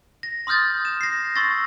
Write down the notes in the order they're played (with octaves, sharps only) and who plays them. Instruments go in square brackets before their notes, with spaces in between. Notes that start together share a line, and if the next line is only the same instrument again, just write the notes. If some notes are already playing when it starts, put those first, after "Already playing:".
[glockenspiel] A#6
C6 D#6 F6 G6 A6
E7
A#6 C7
C6 C#6 E6 A6 A#6